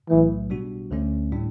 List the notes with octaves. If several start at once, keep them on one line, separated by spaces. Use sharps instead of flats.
B1 A2 E3 F#3 A3
B2 G3 D4 F#4
D2 D3 A3 C#4
A2 G3 D4